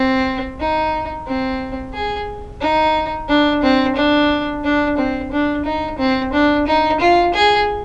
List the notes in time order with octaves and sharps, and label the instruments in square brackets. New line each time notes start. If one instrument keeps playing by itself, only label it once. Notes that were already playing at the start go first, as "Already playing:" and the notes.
Already playing: [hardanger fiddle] C4
D#4
C4
G#4
D#4
D4
C4
D4
D4
C4
D4
D#4
C4
D4
D#4
F4
G#4